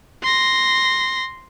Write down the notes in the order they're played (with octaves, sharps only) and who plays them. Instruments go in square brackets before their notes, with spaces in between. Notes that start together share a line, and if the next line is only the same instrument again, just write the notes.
[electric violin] C6 A#6